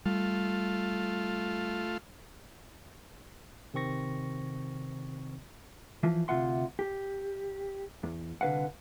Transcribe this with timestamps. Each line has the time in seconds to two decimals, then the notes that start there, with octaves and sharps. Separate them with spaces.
0.05 G3 A3 F4
3.74 C3 D#3 C4 C#6 A#6
6.03 E3 F3
6.28 D2 C3 F4 E5 F#5 C6
6.79 G4
8.03 E2
8.41 C2 D3 B4 F5 F#5